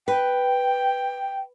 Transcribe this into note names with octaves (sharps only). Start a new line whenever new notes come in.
B4 G5